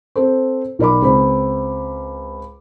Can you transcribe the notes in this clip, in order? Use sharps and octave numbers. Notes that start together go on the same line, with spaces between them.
C4 A4 C5
B1 A#4 D5 B5 D6
C#2 C4 B5